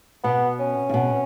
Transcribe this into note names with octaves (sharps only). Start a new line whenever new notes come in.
B2 B3
C#4
C#3
B2